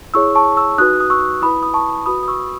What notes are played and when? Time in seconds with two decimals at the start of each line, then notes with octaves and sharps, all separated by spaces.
0.14 E4 G#4 C#5 C#6 E6
0.35 A5 C#6
0.57 C#6 E6
0.78 D#4 F#4 B4 D#6 F#6
1.01 D#6
1.10 C#6 E6
1.42 E4 B4 B5 D#6
1.63 D#6
1.74 A5 C#6
2.06 F#4 B4 B5 D#6
2.23 D#6
2.28 C#6 E6